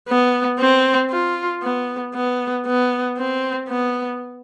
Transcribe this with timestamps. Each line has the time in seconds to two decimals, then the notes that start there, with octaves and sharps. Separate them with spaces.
0.09 B3
0.59 C4
1.11 F4
1.63 B3
2.15 B3
2.66 B3
3.17 C4
3.69 B3